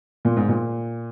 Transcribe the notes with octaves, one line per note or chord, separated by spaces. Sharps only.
A#2
G#2
A#2